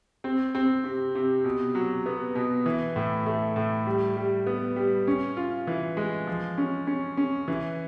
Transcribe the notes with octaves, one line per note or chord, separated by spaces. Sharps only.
C4
C4
C3
C3
B2
F#3
B3
B2
E3
A2
A3
A2
G3
G3
B3
G3
C#4
F4
E3
G#3
F3
C#4
C#4
C#4
E3